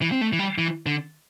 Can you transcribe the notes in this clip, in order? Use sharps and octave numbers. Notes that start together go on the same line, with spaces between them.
E3
C4
A3
E3
G3
E3
D3